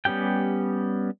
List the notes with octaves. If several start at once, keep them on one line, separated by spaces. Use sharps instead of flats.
G3 B3 C#4 G4 G5